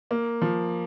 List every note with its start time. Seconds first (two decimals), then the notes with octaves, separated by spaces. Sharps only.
0.11 A#3
0.42 F3